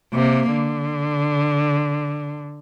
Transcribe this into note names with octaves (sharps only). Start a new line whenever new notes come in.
C3 A#3
D3